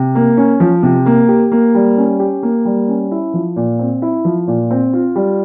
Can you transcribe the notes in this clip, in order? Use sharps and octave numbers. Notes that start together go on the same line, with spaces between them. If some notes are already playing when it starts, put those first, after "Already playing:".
Already playing: C3
A#3
C#4
F3
C3
A#3
G4
A#3
G3
C#4
G4
A#3
G3
C#4
E4
F3
A#2
C4
E4
F3
A#2
C4
F4
G3